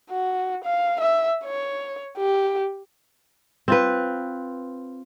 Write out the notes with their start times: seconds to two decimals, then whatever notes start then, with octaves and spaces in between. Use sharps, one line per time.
0.10 F#4
0.64 F5
1.00 E5
1.44 C#5
2.18 G4
3.68 C4 F4 B4